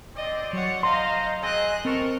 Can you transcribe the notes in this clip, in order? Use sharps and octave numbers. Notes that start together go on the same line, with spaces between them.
C4 D5 D#5
F#3 C#5 F#5
C5 D#5 F5 A#5 C6
C4 G#4 D#5 F#6
C4 A4 A#4 C#6